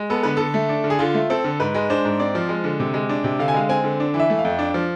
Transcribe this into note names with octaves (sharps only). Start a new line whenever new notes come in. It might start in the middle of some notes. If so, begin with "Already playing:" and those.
Already playing: G#3
B3 A4
D3 B4
D3 A4
A3
D4
D3
G#4
D3 F4
A3
C4 A4
D3
G#2 B4
G#3
D4 C5
G#2
C4 D5
F3
G#3
D3
C3
G#3
D4
C3
D3 F5
G#5
G#3 F5
C4 G#5
D3
D4
E3
E5
A3
F5
F2
D4
F3